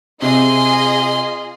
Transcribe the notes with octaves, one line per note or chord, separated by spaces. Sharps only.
C3 F4 G#4 D#5 C6